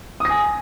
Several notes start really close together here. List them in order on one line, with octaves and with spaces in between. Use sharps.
D#6 A#6 G#5